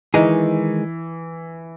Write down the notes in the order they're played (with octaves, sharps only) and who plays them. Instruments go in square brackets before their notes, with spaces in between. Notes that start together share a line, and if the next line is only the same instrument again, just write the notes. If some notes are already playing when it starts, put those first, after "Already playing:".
[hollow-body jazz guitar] D#3 G#3 D#4 G#4 [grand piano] E3